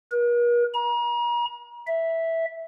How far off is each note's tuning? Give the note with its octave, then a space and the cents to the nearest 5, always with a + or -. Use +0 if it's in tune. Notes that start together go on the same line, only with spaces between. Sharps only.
A#4 +45
A#5 +40
E5 -5